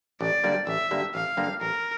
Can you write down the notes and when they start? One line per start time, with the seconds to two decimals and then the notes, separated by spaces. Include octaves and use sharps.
0.21 A1 D5
0.44 G2 D3 G3 A#3
0.67 A1 E5
0.91 G2 D3 G3 A#3
1.14 A1 F5
1.37 G2 D3 G3 A#3
1.61 A1 A#4